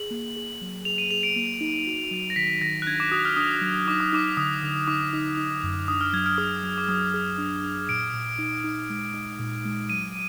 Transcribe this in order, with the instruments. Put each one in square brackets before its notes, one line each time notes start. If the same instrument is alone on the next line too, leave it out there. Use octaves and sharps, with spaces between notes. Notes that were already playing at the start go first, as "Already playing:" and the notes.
Already playing: [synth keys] G#4 [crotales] F#7
[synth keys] A#3
G#4
F#3
[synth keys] G#4 [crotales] F7
[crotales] D#7
[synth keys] G#4 [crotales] F7
[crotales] D7
[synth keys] A#3
D#4
F#4
F#3
[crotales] A#6
[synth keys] D#3 [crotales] B6
[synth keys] D#3 [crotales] A#6
[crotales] F#6
[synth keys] D4 [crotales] G#6
[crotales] D6
[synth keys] F#4 [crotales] D#6
[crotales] F6
[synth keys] D4 [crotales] D#6
[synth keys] F#3
[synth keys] D#4 [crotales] D6
[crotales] D#6
[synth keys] D#4 [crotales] D6
[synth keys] D3 [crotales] D#6
[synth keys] D3
[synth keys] D#4 [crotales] D6
[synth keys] D#4
D#4
F#2
[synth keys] D4 [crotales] D#6
[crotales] F6
[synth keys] F#3 [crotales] G#6
[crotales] F6
[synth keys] G#4 [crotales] D#6
[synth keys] F#3
[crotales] D6
[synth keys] F#3 [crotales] D#6
[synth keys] G#4
D4
D4
[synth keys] A#2 [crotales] D7
[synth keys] A#2
D#4
D#4
G#3
D#4
A#2
G#3
[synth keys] F#3 [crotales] D#7